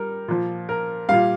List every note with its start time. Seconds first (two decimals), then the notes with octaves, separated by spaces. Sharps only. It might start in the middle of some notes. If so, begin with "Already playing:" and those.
Already playing: G3 A#4
0.28 A#2 F3
0.69 A#4
1.09 A#2 G3 F5